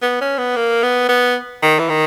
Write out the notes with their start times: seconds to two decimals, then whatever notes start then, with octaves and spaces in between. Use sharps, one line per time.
0.02 B3
0.21 C#4
0.38 B3
0.56 A#3
0.83 B3
1.09 B3
1.63 D#3
1.79 E3
1.89 D#3